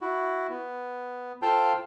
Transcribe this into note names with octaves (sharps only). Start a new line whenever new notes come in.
E4 F#4
B3
F4 A4 C5 F5 G5 A5